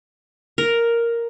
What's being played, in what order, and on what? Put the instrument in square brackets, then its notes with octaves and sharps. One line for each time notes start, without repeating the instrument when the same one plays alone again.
[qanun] A#4